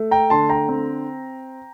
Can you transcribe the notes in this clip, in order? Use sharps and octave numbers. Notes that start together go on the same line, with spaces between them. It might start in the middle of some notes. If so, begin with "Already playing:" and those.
Already playing: A3
G5 A#5
D3 A5 C6
G5 A#5
C4